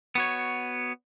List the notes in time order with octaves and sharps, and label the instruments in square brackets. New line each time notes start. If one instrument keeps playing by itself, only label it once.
[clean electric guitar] B3 F#4 C#5